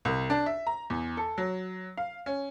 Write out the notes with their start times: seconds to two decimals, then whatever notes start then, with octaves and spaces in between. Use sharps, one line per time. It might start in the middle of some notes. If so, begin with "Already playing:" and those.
0.05 C2
0.30 D4
0.46 E5
0.67 A#5
0.90 E2
1.17 A4
1.38 F#3
1.97 F5
2.26 C#4